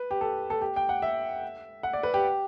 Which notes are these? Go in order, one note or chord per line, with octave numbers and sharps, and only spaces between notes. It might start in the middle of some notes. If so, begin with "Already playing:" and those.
Already playing: B4
G4
A4
A4
G4
G5
F#5
E5
F#5
D5
B4
G4